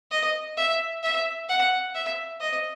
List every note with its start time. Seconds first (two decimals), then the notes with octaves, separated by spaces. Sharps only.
0.11 D#5
0.57 E5
1.03 E5
1.49 F#5
1.94 E5
2.40 D#5